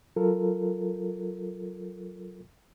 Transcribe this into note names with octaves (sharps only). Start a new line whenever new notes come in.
F#3 F4 A4 A#4